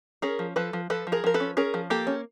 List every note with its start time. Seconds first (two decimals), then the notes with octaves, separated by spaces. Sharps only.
0.22 C#4 G#4 A#4
0.39 F3
0.56 F3 A4 B4
0.73 F3
0.90 F3 A4 B4
1.07 F3
1.12 G#4 A#4
1.24 F3 A#4
1.34 A4 B4
1.40 C#4
1.57 C#4 G#4 A#4
1.74 F3
1.90 A#3 G4 A4
2.07 C#4